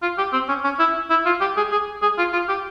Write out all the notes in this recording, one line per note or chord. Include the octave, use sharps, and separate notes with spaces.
F4
G4
C4
C#4
C#4
E4
E4
F4
G4
G#4
G#4
G#4
F4
F4
G4